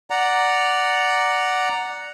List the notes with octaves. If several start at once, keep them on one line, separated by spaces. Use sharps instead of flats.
D5 F#5 A#5